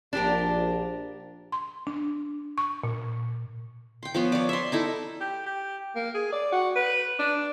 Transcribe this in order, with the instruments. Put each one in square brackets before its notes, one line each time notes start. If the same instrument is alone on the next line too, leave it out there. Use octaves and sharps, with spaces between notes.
[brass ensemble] A#1 [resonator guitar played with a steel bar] D4 G4 A#4
[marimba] C6
D4
C#6
A#2
[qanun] G5 C6
F3 B3 C#5
C#5 D5
E5 C6
D#4 E4 A4
[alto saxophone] G4
G4
A#3
G#4
D5
F#4
B4
D4